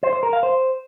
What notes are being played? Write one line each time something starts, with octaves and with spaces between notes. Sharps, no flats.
C5
C5
A#4
F5
C5